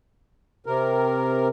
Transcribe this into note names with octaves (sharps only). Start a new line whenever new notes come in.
C3 A#4